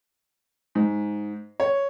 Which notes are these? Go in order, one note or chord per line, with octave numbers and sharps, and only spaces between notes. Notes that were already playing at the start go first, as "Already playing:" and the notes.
G#2
C#5